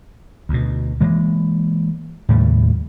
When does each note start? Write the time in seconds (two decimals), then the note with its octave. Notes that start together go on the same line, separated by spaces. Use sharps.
0.49 D2 B2
1.01 E3 G#3 A#3
2.29 D#2 A2 C#3 G3